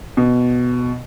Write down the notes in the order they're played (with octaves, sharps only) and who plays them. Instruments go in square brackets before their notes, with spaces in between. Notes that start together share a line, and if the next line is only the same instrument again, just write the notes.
[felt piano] B2